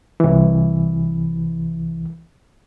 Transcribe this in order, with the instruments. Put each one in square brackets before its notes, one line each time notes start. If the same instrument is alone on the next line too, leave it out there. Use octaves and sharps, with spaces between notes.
[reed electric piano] C2 E3